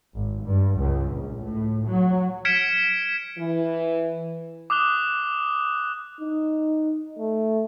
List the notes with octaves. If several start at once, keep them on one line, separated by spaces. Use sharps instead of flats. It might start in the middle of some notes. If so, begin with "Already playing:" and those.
G#1
G2
C#2
A#1
A2
F#3
F6 G#6 B6 C#7 D7 E7
E3
D6 D#6 F#6 G7
D#4
A3